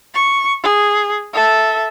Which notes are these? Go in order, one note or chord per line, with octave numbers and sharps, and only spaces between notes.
C#6
G#4
A4 E5